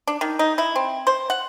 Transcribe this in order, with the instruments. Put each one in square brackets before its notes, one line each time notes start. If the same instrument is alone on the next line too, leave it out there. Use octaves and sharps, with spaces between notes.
[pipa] D4
D#3
D#4
E4
C4
C5
F#5